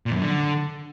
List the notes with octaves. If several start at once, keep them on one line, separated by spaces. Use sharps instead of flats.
A#2
F2
F#2
D3